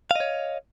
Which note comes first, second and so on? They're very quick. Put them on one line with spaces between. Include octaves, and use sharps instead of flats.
F5 D#5 C#5